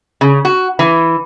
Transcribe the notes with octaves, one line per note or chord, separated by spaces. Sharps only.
C#3
F#4
E3